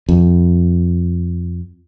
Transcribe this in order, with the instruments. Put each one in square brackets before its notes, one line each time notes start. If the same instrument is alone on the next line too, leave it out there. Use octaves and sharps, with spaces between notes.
[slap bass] F2